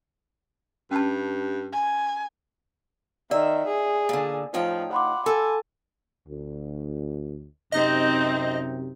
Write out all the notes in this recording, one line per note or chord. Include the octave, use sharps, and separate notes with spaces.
G2 C#4 A5
G#5
D#3 D5 E5
G#4
A#2 D3
A2 F3 D#4 G5
F#5 B5 C6 D6
A4 G#5
D2
F#2 C3 C4 D#4 D#5